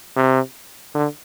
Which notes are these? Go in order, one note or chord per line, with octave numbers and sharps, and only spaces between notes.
C3
D3